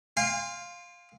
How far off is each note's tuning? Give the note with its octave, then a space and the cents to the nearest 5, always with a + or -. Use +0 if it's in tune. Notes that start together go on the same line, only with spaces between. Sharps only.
F5 +5 G#5 -45 C6 +0